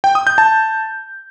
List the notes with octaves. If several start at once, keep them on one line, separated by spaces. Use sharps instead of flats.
G5
D#6
G6
A5